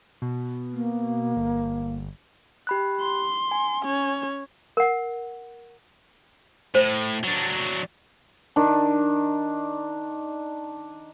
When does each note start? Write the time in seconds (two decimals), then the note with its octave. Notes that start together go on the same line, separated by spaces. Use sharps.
0.22 B2
0.73 A#3
1.37 G1
2.67 G4 B5 F#6
3.01 C6
3.51 G#5
3.82 C#4 C#5
4.77 A#4 F#5
6.75 A2 C5
7.23 F#3 D4
8.56 D#3 D4